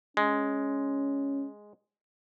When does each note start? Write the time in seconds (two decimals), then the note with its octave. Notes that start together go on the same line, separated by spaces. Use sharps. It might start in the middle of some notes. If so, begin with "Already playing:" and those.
0.17 G#3 C#4